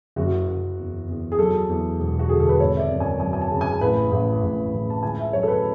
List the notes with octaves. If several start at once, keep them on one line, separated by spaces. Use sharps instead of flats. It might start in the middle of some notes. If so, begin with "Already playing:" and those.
F#1 F#4
F#1
E2
E2
G#4
F#3 A4
E2
E1
F#4
D3 G#4
A4
B4
G#1 C#5
E5
D5
F#2
G#5
F#3 G#5
G#5
A5
C#3
G#5
A1 B4
A1
A1
A1
A5
C#2 G#5
E5
F#3 C#5
A4
B4